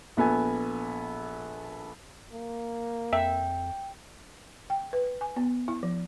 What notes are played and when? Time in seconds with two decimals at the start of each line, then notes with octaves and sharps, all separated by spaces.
0.17 A#1 B3 A4 G#5
2.32 A#3
3.13 F2 E5 G5
4.70 G5
4.93 B4
5.21 G#5
5.36 B3
5.68 E4
5.83 F3